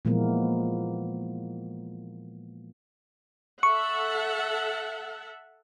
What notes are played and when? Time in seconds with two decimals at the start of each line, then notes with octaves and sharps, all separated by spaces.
0.05 A#2 E3 F3 G#3 A#3 B3
3.63 A4 E5 F#5 C#6